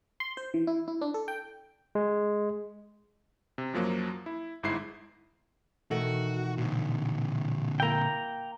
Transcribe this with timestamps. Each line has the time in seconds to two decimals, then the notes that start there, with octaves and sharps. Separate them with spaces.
0.20 C6
0.37 C5
0.54 E3
0.67 E4
0.88 E4
1.01 D4
1.14 A4
1.28 G5
1.95 G#3
3.58 C3
3.73 F#2 F3 F#3 A#3
4.26 E4
4.63 G1 G#2 E4 C7
5.91 B2 D#3 E3 A3 F#4
6.58 A#2 D3
7.80 A#3 E4 G5 A#5